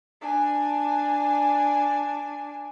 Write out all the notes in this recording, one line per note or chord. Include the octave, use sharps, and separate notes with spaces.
D4 G#5